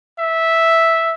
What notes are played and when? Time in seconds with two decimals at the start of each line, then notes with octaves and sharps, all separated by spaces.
0.19 E5